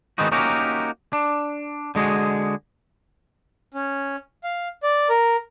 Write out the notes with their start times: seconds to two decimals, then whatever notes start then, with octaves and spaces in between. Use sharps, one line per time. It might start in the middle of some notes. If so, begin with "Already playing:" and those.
0.18 D#3 G#3 B3 C4 D#4 F#4
0.32 A#3 C#4 D#4 F#4 G4 A#4
1.13 D4
1.95 D3 G#3 F#4 G#4
3.74 C#4
4.44 F5
4.83 D5
5.09 A#4